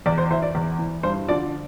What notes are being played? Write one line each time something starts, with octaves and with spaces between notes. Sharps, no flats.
E2 D5
C5
E3 C5 E5
D5
E2
E3
G2 C5
D3 F3 D5